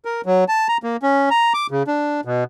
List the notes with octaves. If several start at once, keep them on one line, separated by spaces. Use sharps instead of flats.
A#4
F#3
A5
A#5
A#3
C#4
A#5
D6
C#3
D4
B2